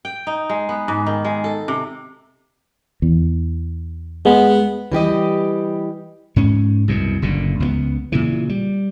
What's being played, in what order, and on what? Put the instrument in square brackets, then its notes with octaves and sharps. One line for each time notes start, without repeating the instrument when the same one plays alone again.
[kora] G5
D#4
G#3
B3
G#2
D#3
G#3
A4
C3
[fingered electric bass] E2
[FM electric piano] G#3 [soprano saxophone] B3
[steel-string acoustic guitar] E3 G3 G4 D#5
[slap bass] G#2 C#4
C2 F#2 B2
F#1 A#2 D3
C#2 G3 B3
A#2 C#3 E3
G3